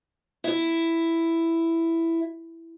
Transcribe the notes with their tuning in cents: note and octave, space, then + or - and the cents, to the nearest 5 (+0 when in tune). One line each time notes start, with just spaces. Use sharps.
E4 +5